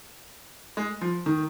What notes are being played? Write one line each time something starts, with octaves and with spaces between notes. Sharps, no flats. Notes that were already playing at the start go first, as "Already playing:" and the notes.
G#3
F3
D#3